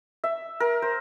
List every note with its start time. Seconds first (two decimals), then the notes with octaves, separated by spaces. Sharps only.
0.24 E5
0.60 A#4
0.82 C5